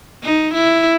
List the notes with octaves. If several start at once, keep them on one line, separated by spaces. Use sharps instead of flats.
D#4
E4